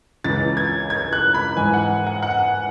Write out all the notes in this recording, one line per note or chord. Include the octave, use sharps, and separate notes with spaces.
C#2 C#3 E3 A6
G#6
G#6
F#6
B5
G#2 E3 G#5
F#5
F#5
F#5